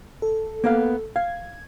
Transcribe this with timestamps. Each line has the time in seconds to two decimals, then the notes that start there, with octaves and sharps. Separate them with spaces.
0.22 A4
0.64 A#3 B3 F5
1.16 F5 G#6